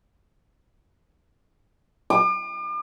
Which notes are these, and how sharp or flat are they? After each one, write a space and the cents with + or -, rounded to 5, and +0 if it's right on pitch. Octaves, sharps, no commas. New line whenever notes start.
D6 +40